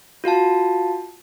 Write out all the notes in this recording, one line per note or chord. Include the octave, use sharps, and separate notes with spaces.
F4 F#4 F5 A5